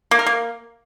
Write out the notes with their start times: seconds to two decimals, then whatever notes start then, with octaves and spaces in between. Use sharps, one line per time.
0.11 A#3
0.19 A#4
0.27 A#3